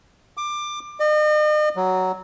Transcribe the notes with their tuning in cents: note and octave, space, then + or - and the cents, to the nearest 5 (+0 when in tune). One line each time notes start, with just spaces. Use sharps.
D6 +20
D#5 -40
F#3 +10